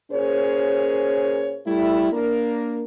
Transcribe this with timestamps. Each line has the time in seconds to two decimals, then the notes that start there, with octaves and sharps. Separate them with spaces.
0.11 A#2 C#4 G#4 A#4 C5 C#5
1.66 G3 A3 E4
2.12 A#3 D4 A#4